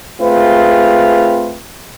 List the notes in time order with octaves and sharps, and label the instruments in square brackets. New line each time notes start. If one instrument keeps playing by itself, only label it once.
[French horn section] A3 C4 F4 G#4 B4